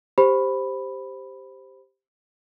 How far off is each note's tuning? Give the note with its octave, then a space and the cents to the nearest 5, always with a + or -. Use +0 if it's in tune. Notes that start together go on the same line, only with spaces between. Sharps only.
G4 +0 C5 +0 B5 +0